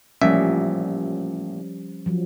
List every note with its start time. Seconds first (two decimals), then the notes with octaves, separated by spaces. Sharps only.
0.21 A1 A#2 F3 G3 C#4 E5
2.06 F3 F#3